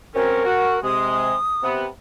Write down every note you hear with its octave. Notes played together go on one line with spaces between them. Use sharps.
F#2 C4 C#4 A#4
F#4
C3 G#3 D#6
C3 B3